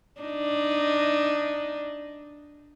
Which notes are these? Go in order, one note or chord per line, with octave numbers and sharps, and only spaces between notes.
D4 D#4